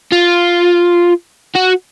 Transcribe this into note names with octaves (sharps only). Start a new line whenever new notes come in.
F4
F#4